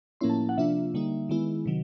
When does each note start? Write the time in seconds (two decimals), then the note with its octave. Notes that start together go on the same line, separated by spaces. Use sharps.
0.21 A2 F3 A#3 C#4 E4 C6
0.30 A5
0.49 F#5
0.57 C3 F3 A#3 D4 F4 E5
0.94 D3 G3 A#3 D#4
1.29 D#3 G#3 B3 E4
1.66 C3 D#3 F#3